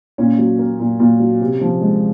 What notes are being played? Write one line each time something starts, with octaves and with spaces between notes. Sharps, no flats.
A#2 C#4
F#3
A#3
A#2
A#2
F#3
C3
F3
G#3